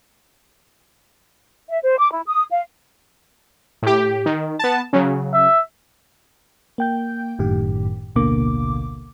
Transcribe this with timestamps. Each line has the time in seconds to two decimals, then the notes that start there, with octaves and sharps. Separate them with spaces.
1.69 E5
1.83 C5
1.98 D6
2.12 E4
2.28 D#6
2.51 F5
3.82 A2 G4
4.26 D#3
4.59 B3 A5
4.93 C#3 F#3
5.34 E5
6.78 A#3 G5 G6
7.39 G1 F#2 A2 D#3 G4
8.16 A1 D2 B2 D3 A#3 D6